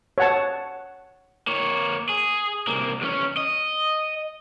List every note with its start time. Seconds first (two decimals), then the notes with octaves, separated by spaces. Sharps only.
0.18 C#5 F#5 A5
1.47 A#3 C#5
2.09 G#4
2.67 C2 A#3
3.01 E2 C#4
3.37 D#5